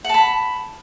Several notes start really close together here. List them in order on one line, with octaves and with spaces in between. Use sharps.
F#5 A5 B5